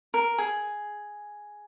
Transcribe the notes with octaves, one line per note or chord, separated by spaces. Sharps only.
A#4
G#4